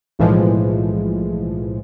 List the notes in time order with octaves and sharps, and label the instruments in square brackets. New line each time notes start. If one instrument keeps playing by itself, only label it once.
[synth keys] B1 A2 E3 F3 G#3